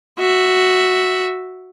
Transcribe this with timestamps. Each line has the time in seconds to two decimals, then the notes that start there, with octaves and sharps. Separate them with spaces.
0.19 F#4 E5